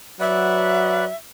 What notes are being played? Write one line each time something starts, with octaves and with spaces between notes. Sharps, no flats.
F#3 B4 D5 E5 F#5